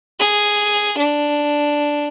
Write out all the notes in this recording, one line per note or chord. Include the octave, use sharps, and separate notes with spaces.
G#4
D4